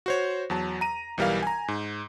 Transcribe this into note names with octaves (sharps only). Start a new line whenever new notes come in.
F#4 C5 C#5
E2 F#3 A5
A#5 D#7
B1 E3 G3 A#4 F5
G#5 A#5
G#2